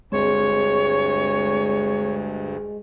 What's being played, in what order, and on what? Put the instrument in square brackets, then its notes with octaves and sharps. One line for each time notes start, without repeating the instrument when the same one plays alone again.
[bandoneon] D2 G2 [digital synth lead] G#3 [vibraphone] C4 G#4 [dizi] C#5